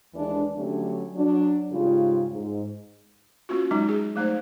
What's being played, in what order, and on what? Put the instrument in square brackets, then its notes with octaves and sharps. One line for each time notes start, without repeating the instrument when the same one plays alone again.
[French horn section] D#2 E3 G#3 D4
D3 F#3 G3 A3 C#4 D4
F#3 D4
G#2 C#3 G3 F4
G#2
[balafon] A#3 C#4 F4 F#4
F#3 G#3 D#4
G#4
F#3 A3 D#4 C5